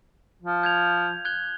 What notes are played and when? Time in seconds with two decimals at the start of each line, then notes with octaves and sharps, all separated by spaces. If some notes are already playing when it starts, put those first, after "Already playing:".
0.42 F3
0.63 G6 G#6 F7
1.25 F#6 G#6 G7